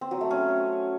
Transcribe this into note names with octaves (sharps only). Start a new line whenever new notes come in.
C4
F#3
A3
C#4